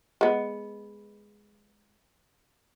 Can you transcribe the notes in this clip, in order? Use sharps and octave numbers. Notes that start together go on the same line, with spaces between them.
G#3 B3